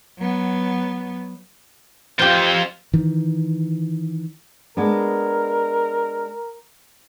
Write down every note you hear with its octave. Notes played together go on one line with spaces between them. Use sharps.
F#3 B3
F2 F4 G4 C5
D#3 E3
G#3 B3 D4 A#4